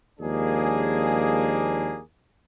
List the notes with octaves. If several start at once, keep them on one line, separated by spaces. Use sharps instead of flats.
D#2 F3 G#3 A#3 D4 G#4